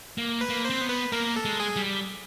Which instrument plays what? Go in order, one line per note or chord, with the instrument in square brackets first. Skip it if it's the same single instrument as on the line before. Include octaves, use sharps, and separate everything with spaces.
[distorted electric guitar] A#3
[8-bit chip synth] B4
[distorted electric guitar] A#3
[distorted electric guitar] C4 [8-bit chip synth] C5
[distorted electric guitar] B3
[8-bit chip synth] B4
[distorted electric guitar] A#3 [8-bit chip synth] A#4
[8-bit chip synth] A4
[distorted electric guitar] G#3
[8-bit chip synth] G#4
[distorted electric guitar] G3